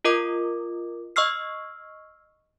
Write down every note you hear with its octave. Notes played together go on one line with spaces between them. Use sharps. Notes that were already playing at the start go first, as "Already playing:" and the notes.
F4 A#4 D#5 D6
D#5 C#6 E6 F6 C7